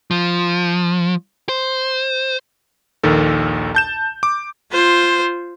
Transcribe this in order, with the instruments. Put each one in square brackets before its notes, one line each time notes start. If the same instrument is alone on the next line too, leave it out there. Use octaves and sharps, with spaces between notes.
[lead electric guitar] F3
C5
[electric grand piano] A#1 D#2 D#3 A4
A5 G6 E7
D6
[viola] F4 C5